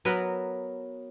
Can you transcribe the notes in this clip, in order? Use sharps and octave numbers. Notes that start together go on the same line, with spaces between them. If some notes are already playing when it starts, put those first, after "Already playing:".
F#3 B3 A#4 B4